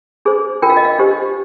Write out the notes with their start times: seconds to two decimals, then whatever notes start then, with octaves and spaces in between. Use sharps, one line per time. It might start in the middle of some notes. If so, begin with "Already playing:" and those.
0.25 D4 G#4 C5
0.62 D4 F4 A#4 G5
0.70 F5
0.77 D#5
0.85 F5
0.98 D4 G4 C5